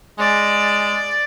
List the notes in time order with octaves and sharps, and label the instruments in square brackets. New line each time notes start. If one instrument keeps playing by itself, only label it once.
[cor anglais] G#3 [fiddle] D5